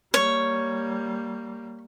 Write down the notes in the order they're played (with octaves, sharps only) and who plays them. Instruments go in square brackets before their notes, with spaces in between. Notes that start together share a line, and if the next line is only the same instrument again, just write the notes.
[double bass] G3 A#3 [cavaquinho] C#5